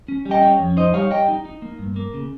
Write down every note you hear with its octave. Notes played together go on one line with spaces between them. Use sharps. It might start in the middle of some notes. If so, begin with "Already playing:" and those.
C#4
G3
D#5 G5
C#4
F2
D#4 C5 D#5
G3 C#5 F5
G3 D#5 G5
D#4
D#4
A#3
G2
A#3
C#3